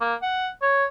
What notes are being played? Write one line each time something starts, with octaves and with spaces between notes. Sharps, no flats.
A#3
F#5
C#5